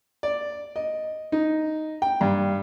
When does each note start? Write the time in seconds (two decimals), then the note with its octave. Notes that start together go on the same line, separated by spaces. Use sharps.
0.23 D5
0.76 D#5
1.32 D#4
2.02 G5
2.21 G2